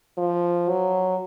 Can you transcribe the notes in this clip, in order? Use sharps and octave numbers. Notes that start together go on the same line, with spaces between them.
F3
F#3